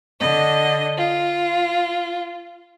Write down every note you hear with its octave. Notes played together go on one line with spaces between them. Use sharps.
D3 D#5
F4